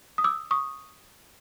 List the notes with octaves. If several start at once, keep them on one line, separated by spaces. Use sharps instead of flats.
D#6
D6 E6
C#6 D#6